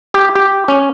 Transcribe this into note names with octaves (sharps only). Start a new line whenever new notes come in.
G4
G4
C#4